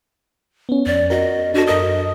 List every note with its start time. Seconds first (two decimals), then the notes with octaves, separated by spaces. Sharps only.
0.69 B3 C#4
0.87 F2 D5
1.10 F#4 A#4 D#5
1.54 D4 F#4 A4
1.68 F#2 A#4 D#5 D#6